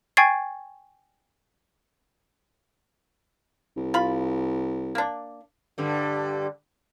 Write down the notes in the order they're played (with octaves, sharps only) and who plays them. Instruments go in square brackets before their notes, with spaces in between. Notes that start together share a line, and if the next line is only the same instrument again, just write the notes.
[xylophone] G5 G#5 C#6 G#6 A6 C7
[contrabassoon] C2
[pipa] F4 B5
A#3 D4
[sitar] G2 D3 G3